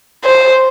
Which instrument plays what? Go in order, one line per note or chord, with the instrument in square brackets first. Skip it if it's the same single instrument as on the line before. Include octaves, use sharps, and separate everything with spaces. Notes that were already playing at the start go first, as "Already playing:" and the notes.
[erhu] C5